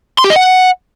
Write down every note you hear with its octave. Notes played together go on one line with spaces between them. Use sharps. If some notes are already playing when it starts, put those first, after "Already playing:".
C6
G4
D#5
F#5